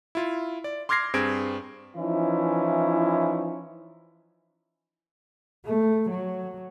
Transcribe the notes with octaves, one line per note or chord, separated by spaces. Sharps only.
E4 F4
D5
C6 D6 F6 G#6 A#6 C7
G2 C4 G#4 G#6 D7
E3 F3 C#4 D#4 E4
A3
F#3